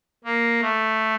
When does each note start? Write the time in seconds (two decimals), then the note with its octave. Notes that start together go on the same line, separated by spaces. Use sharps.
0.24 A#3
0.61 A3